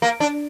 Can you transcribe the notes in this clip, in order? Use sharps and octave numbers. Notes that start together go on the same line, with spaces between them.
A#3
D4